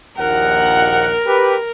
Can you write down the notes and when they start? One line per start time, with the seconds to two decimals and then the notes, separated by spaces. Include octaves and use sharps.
0.18 A#1 D#2 A#4 F#5
1.26 G4 B4